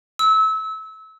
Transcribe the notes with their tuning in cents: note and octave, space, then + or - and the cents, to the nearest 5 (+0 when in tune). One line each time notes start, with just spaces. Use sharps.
E6 -25